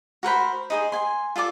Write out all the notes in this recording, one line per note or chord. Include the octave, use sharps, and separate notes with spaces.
F#4 A#4 C5 B5
D#4 G#4 C5
G#5 C6
F4 A4 D5 D6